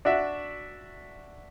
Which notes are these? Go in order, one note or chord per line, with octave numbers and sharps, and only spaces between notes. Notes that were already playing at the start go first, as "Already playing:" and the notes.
D4 F#4 E5